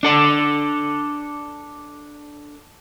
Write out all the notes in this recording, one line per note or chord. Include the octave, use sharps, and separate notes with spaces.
D4 A4 D5